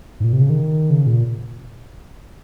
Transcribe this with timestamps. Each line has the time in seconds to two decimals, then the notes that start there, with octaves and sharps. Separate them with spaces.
0.20 G#2
0.24 A#2
0.33 C3
0.41 C#3
0.50 D#3
0.90 C#3
1.07 A#2